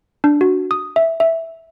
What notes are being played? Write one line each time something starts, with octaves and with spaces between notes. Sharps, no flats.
D4
F#4
D#6
E5
E5